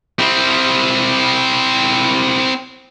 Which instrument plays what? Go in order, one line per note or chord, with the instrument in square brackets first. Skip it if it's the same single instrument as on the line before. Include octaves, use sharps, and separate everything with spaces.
[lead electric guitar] C4 E4